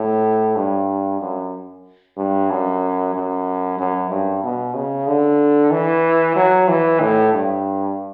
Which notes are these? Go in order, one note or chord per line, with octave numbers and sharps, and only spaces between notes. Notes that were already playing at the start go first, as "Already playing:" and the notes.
Already playing: A2
G2
F#2
G2
F#2
F#2
F#2
G2
B2
C#3
D3
E3
F#3
E3
A2
G2